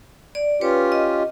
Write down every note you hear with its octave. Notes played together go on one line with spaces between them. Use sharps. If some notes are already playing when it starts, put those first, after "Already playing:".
D5
C#4 F4 G4 B4 C#5
D#5